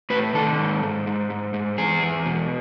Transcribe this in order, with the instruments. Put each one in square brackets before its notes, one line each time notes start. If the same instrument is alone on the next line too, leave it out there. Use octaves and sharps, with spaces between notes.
[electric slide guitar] A2 B4
D#3 A4
G#2
G#2
G#2
G#2
G#2
E2 G#4
E2
B2